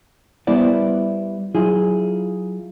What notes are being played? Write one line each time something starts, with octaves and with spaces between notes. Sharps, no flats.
G3 B3 E4 C5 D5
F#3 E4 F4 G#4